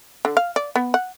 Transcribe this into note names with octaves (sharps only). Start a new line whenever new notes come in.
D3
F5
D5
B3
F#5